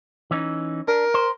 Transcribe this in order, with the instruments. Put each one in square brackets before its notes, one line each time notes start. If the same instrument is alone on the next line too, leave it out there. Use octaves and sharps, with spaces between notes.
[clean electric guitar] E3 C#4 D#4
[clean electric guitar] D4 [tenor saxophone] A#4
[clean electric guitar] C5